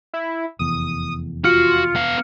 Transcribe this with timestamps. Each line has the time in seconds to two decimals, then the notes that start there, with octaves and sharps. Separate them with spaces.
0.14 E4
0.59 F1 E2 D#6
1.44 F4 F#4 F6 C#7
1.96 B3 F5